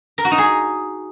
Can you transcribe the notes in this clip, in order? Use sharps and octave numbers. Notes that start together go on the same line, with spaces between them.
A#4
F#4
D#4
G#4